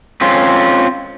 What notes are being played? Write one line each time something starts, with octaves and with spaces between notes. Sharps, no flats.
C4 C#4 F4